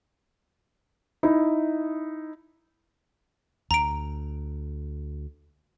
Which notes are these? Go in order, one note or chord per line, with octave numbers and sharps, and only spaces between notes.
D#4 E4
D2 A#5 D7